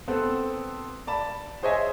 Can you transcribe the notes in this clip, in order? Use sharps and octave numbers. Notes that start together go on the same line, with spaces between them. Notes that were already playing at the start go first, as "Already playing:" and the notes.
B3 C4 A4
D5 A5 B5
G#4 C5 C#5 D#5 E5 G#5